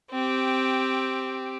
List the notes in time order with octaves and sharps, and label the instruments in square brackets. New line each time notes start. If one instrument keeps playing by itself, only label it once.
[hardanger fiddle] C4 G4